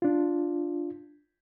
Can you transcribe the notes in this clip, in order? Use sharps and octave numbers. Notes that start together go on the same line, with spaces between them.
D4 F4